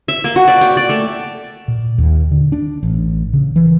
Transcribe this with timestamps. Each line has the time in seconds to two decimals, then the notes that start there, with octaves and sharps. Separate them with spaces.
0.08 E5
0.24 A#3
0.36 F#4
0.48 D5
0.61 G5
0.77 D5
0.89 A3
1.68 A#2
1.98 D#2
2.31 D3
2.52 D4
2.83 A1
3.33 C#3
3.56 E3